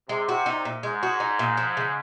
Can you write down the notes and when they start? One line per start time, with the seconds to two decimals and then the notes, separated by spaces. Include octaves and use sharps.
0.09 C3 G#3
0.29 F#4
0.46 D#4
0.65 A#2
0.83 G#2 G#3
1.03 F#4
1.20 D#4
1.39 A#2
1.57 F3
1.77 C#3